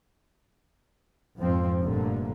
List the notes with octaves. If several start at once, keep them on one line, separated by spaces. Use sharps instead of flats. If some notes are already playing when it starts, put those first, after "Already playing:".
F2 G#2 F3 C4
F1 G2 A#2 D3 A3 A#3